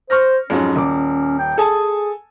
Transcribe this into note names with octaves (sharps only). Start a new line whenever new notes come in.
C5 C#6 F6 A#6
F2 G#2 F#3 C#4
D#1 D6
G5
G#4 A4 G#5 A5